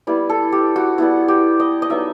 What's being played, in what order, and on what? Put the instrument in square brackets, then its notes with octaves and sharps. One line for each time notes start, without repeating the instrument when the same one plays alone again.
[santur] G3 B3 E4 B4
A4
G4
F#4
G3 B3 E4 F#4
G4
D#5
D#5
F#3 B3 D#4 E5